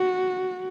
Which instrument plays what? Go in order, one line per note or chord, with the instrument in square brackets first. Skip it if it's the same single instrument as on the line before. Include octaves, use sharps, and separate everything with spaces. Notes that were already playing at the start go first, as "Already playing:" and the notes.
Already playing: [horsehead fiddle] F#4